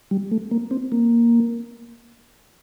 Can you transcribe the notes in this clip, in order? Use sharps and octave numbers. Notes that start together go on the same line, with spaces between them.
G3
A3
A#3
C4
A#3